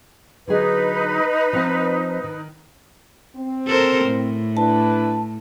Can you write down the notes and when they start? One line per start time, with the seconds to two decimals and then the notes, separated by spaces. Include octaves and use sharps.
0.48 D3 F#3 D#4 G#4 B4
1.53 F3 C4 F4
2.24 D#3
3.36 C4
3.67 A4 A#4 C5
4.05 A2
4.57 D4 E4 B4 A5